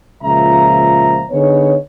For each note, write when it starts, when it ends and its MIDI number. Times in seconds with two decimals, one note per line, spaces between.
0.23 1.23 37
0.23 1.23 46
0.23 1.23 53
0.23 1.23 65
0.23 1.23 76
0.23 1.23 82
1.31 1.76 50
1.31 1.76 59
1.31 1.76 63
1.31 1.76 68
1.31 1.76 73